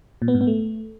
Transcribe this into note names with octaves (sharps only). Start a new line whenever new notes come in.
A#2
B3
G#2
B3
A3